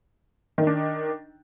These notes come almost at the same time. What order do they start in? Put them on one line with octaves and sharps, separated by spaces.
D#3 D#4 D4